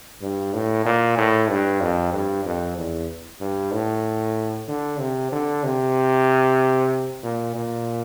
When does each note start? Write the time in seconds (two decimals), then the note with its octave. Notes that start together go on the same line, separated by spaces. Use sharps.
0.22 G2
0.54 A2
0.85 A#2
1.18 A2
1.49 G2
1.81 F2
2.13 G2
2.45 F2
2.77 E2
3.41 G2
3.73 A2
4.68 D3
4.99 C3
5.32 D3
5.64 C3
7.23 A#2
7.55 A#2